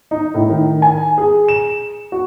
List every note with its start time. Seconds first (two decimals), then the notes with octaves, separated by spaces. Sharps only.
0.11 D#4
0.34 A2
0.50 D#3
0.82 G#5
1.18 G#4
1.48 E7
2.12 F#4